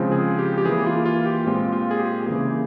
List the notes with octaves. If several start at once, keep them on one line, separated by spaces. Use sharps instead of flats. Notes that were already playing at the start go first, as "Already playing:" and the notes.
Already playing: C#3 F3 G#3 C4
G#4
G4
G4
E3 A#3 G#4
F4
F4
G4
A#2 G#3 C4 F4
F4
G#4
G4
C#3 E3 A#3 G#4